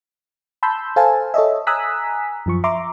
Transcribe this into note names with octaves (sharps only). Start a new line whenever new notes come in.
A5 B5 C6 E6 G6
A4 C5 F5 G#5 A5
A4 C#5 D#5 E5
G#5 A#5 D#6 E6 F#6 B6
F#2 F3 C#6
E5 A#5 C6 D6